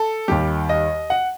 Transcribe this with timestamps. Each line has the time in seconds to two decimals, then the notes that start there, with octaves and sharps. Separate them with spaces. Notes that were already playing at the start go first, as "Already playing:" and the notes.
Already playing: A4
0.28 D#2 D#3 G3 G4
0.69 D#5
1.10 F#5